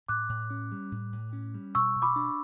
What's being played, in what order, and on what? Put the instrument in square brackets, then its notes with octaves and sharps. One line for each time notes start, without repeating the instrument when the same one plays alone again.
[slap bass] A2 [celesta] D6 F#6
[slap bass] A2
C#4
G3
A2
A2
C#4
G3
[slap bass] B2 [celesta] C#6 E6
[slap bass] B2
[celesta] B5 D6
[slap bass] D4